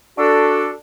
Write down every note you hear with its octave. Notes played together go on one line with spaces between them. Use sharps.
D4 F#4 A4